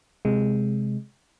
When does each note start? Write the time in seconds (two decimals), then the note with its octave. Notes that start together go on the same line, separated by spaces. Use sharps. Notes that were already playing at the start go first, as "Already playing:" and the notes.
0.25 C3 G#3